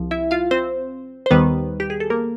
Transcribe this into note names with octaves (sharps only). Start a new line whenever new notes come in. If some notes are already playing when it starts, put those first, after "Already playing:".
Already playing: C2 F3
E4 E5
F4 F5
C4 C5
C5
D#2 D#3 G3 B3 B4
G4
G#4
A4
A#3 A#4